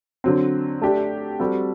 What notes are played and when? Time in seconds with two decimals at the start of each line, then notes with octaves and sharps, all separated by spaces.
0.24 D3 F#3 C4
0.82 A3 D4 G4
1.39 G3 C4 F#4 A4